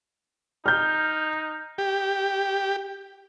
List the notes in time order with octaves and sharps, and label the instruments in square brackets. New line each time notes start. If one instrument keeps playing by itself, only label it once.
[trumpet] D#4 [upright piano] F6 G6
[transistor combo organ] G4